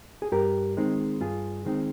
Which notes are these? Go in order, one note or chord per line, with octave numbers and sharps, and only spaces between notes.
G#4
G2 G4 A#4
D#3 G#3 C4 D#4
G2 F4 G#4
D#3 G#3 C4 D#4